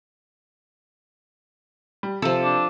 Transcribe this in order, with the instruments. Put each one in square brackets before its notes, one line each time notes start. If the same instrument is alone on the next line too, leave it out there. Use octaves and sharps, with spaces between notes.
[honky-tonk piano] G3
[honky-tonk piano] C3 [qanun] F3 A4
[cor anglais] D4